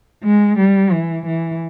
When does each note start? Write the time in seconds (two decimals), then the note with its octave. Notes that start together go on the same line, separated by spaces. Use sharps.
0.24 G#3
0.58 G3
0.92 E3
1.26 E3